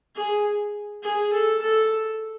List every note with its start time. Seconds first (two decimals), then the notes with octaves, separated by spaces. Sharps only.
0.15 G#4
1.03 G#4
1.33 A4
1.62 A4